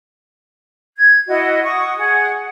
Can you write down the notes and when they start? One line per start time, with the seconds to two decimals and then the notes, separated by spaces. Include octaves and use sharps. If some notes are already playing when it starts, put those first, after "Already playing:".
0.97 G#6
1.28 E4 F#4 D#5 F#5
1.63 F#5 C#6 D#6
1.97 G#4 F#5